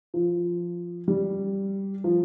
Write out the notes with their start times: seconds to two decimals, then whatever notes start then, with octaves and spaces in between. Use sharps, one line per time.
0.14 F3
1.08 G3
2.04 F3